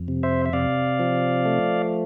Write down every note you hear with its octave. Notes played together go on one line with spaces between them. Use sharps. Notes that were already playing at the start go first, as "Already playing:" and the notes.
Already playing: F2
C3
C5 E5
E5
C3 D5 F5
F3
A3